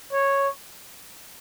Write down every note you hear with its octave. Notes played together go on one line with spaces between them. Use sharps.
C#5